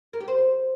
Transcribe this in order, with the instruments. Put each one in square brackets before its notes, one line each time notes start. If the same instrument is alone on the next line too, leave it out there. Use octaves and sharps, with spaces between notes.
[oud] A#4
G4
C5